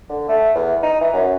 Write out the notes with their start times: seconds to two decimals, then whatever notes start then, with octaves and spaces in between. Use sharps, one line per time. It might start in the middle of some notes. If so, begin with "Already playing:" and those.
0.09 D3
0.29 A3
0.55 E2
0.83 D#4
1.01 E3
1.14 F#2